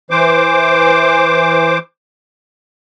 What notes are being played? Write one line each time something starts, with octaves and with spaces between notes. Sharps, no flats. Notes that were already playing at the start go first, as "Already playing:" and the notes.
E3 C5 D6